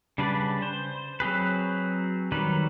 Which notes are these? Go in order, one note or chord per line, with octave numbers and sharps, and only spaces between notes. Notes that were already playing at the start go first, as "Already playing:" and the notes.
C#3 G3 D4 B4 D5
C5
F#3 C4 G#4 B4
D#3 F#3 G3 B4